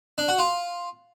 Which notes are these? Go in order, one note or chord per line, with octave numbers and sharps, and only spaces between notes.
D4
F#4
F4